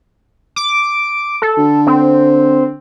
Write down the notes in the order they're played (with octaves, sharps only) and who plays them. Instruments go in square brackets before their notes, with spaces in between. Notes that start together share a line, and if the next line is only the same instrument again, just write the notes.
[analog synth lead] D6
A4
[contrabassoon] D3
[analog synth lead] C4